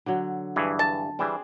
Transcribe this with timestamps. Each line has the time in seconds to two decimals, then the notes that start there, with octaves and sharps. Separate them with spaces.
0.06 D3 F#3
0.56 G2 E3 G#4
0.79 A5
1.19 E3 G3 C4 D4 G#4